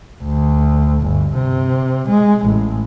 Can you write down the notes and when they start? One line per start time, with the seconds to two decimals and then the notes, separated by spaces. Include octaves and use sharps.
0.22 D2
1.01 G1
1.35 C3
2.09 G#3
2.46 A1